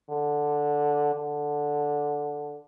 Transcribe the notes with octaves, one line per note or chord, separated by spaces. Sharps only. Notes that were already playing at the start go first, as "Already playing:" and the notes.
D3
D3